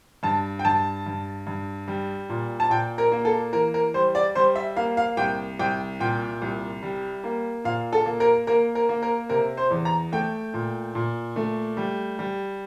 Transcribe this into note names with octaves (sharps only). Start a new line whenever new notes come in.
G2 A5
G5
G2 A5
G2
G2
G3
A#2
A5
A#2 G5
A#4
A#3
A4
E3 A#4
A#4
G3 C5
D5
G3 C5
E5
A#3 F5
F5
C2 G5
C2 G5
A#2 G5
C2
G3
A#3
A#2 F5
A4
A#3
A#4
A#3 A#4
A#4
A#3
A#4
C3 A#4
C5
E2
A#5
A3 G5
A#2
A#2
A3
G3
G3